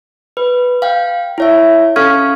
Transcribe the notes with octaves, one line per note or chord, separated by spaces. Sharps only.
B4
F5 G5
E4 C#5 E5
C#4 A4 F5 C#6 F6 G#6